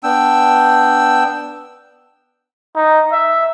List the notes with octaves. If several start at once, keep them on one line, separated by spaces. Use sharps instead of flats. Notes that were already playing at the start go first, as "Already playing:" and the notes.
B3 D4 G5 E6
D#4
E5